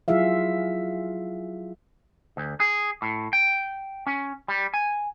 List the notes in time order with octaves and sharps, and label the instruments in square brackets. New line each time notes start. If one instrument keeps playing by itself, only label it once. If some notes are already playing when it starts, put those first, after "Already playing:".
[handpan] F#3 E4 F4 G#4 E5 F5
[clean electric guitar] D2
G#4
A2
G5
C#4
G3
G#5